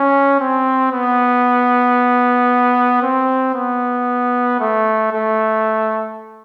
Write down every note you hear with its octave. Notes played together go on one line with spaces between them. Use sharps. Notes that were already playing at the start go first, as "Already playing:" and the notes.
Already playing: C#4
C4
B3
C4
B3
A3
A3